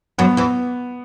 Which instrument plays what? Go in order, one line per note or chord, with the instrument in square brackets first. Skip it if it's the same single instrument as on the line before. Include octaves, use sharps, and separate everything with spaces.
[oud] F#2 F#3 [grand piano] B3
[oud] E2 E3